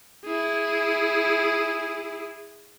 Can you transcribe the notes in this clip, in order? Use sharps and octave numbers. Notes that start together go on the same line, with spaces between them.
E4 G#4